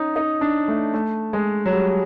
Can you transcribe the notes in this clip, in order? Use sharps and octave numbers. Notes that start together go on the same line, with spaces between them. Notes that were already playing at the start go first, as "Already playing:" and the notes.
Already playing: C#4 D#4
D#4
D4
A3
A3
G#3
F#3
G3